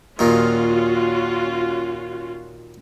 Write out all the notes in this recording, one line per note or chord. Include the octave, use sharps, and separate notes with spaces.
D#2 A#2 D#3 C#4 F4 F#4